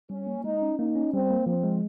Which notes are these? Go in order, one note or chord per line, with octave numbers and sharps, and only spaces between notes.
G3 C#4
A#3
G#3 D#4
C#4
A#3 D#4
C#4
G3 C4
A#3
F3 C4
G#3